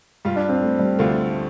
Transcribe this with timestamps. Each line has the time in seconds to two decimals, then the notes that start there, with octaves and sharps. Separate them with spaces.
0.25 G2 G3 F4
0.36 D4
0.49 C4
0.62 A3
0.79 G3
0.99 D2 D3 A3 F4